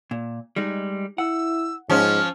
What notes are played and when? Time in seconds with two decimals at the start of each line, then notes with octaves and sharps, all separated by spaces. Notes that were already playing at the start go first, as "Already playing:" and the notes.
0.11 A#2
0.56 G3 G#3 D#4
1.18 E4 F#5 E6
1.90 G#2 F3 C#4 F6